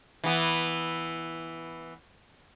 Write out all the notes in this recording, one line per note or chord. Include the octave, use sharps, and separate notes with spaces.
E3 B3